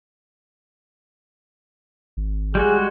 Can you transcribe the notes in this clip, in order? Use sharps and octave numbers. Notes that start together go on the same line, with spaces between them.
G#1
G3 G#3 F#4 G#4